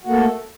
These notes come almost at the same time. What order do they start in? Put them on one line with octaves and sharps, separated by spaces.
F#4 A#3 A4 A3